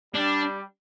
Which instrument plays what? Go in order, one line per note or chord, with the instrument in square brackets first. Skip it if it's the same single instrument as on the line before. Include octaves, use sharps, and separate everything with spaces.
[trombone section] G3 [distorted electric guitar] D4